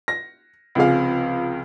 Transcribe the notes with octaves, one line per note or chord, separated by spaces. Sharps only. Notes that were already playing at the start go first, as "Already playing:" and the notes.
A#6
C#2 C3 F3 G#4 F5